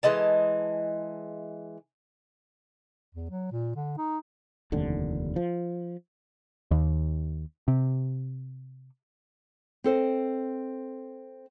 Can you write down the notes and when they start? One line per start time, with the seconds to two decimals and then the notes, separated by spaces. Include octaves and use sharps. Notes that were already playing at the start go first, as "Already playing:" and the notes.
0.03 E3 G#3 D#5 A5
3.15 E2
3.31 F#3
3.52 A#2
3.76 D3
3.98 D#4
4.72 F1 D#2 D3
5.36 F3
6.71 D#2
7.68 C3
9.84 C4 A4 C5 D#5